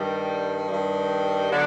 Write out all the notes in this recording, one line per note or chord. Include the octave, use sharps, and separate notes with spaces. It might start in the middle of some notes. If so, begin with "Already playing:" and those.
Already playing: G2 D#3 G3
G2 D#3 G3
D3 F#3 B3 D4